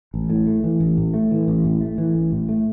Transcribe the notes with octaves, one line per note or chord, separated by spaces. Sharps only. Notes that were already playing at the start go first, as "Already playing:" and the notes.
A1
A2
A3
E3
A1
A2
A3
E3
A1
A2
A3
E3
A1
A2
A3